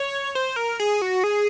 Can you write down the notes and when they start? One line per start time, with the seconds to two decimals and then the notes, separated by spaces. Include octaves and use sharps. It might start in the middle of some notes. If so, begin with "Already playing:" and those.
Already playing: C#5
0.35 C5
0.56 A#4
0.80 G#4
1.02 F#4
1.24 G#4